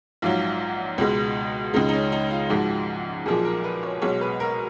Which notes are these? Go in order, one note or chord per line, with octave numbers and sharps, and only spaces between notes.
A#1 G#2 F#3 F4
C#2 B2 G#3
C#2 C#3 G#3 D#4
D#4
C#4
D#4
F4
A#1 G#2 F3 G#3 F#4
B1 A#2 F3 G#3 G#4
A#4
B4
C#5
B1 B2 G#3 C#5
B4
A#4